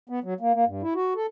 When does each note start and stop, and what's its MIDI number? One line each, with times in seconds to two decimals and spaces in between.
0.09 0.20 59
0.24 0.34 54
0.40 0.53 58
0.54 0.65 58
0.67 0.82 43
0.82 0.94 64
0.95 1.14 66
1.16 1.26 69